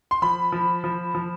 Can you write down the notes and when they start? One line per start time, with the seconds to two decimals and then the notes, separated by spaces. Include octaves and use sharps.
0.11 C6
0.22 F3 B5
0.52 F3
0.84 F3
1.15 F3